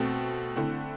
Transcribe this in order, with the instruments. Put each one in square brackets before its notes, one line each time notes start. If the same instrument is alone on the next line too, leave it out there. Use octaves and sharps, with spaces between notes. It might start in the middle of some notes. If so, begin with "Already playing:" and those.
Already playing: [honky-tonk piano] B2 A3 C4
D3 A3 C4 E4